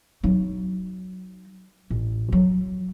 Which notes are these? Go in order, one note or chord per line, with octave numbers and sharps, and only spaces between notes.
F#3 D#4
A1
F#3